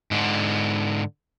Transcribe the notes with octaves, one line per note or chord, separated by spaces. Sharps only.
G#2 D3